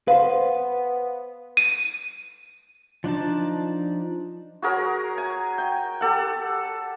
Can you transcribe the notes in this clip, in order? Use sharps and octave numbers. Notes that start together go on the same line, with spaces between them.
B3 B4 C5 F5
D#7
F3 D4 D#4 A5
F#4 G#4 A#4 C#5
G#5
G5
G4 A4 F#5